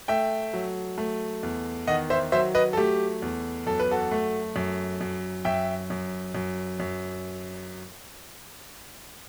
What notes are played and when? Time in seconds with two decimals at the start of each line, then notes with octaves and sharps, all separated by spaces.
0.08 A3 E5 G5
0.53 F#3
0.98 A3
1.43 E2
1.87 D#3 D#5 F#5
2.10 C5 E5
2.32 F#3 C5 E5
2.55 B4 D#5
2.73 A4
2.77 A3 G4
3.22 E2
3.66 F#2 A4
3.80 B4
3.91 F#4 A4
4.11 A3
4.56 F#2
5.01 F#2
5.45 F#2 E5 G5
5.90 F#2
6.35 F#2
6.80 F#2